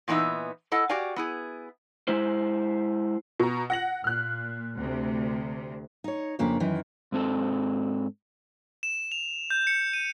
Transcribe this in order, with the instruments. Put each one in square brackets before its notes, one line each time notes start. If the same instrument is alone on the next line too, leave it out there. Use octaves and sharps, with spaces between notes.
[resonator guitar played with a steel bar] A#2 E3 B3 D#4 E5
E4 A4 D#5 F#5
F#4 G4 D5 F5 G#5
B3 E4 G#4
[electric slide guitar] G#3 E4 C5
[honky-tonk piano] B2 A#5
F#5 A#6 F#7
[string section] A#2 [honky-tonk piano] F6 F#6
[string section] D2 C3
[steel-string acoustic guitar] D#4 C#5
F2 C#3 A#3 D4 C#5
F#2 D#3 E3
[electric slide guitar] G#2 C4 A4
[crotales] E7
F7
G6
C#7
D#7